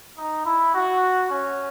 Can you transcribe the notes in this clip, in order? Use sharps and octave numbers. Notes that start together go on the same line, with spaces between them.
D#4
E4
F#4
C#4